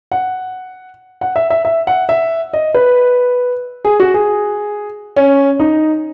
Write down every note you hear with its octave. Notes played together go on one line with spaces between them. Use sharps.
F#5
F#5
E5
E5
E5
F#5
E5
D#5
B4
G#4
F#4
G#4
C#4
D#4